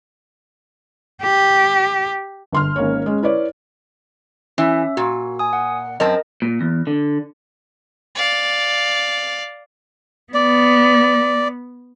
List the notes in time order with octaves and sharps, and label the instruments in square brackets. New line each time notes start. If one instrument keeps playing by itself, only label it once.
[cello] G4
[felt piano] G1 C6 F6
G#1 A#3 C#4 C#5
G#3 C#4
E4 B4 C#5 D5
[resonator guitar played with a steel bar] E3 [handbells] C#4 E5
[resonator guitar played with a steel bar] A#2 [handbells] F#4
[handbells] G#5 D#6
F#5
[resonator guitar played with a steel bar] F#2 C4 A5 [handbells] A#4 D#5
[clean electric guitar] A#2
E2
D3
[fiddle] D5 F5
[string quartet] B3 [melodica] D5